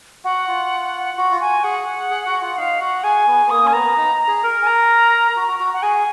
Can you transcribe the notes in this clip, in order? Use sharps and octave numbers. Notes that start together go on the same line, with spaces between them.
F#4 F#5
F4
F#4 F#5
F4
F#4 G#5
G#4 F#5
G#4
F#4
F4
D#4 F5
F#4 F#5
G#4 G#5
B3
B3
A#3 D#6
C#4 G#5
B3 A#5
D#4
G#4
A#4
G#5
A#5
F#4
F#4
F#4
F#5
G#4 G#5